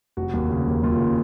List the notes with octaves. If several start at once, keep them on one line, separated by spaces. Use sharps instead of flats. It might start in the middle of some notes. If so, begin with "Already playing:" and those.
F1 F#4
D#2
C#3
D#2
D#2 F4
C#3